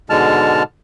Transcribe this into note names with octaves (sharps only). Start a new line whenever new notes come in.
G#2 B2 D3 G#3 A5 F6